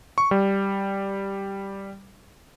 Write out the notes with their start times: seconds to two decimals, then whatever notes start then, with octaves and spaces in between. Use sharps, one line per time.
0.18 C#6
0.31 G3